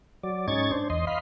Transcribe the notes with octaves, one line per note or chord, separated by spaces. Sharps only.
F#3 D5
G#2 C#4 D#4 C#6 G#6 A6
D4 C5
E2 D#5 C6
D#5 F5 B5 C6